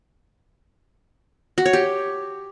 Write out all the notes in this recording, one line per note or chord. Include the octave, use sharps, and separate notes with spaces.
F#4
C#5
G4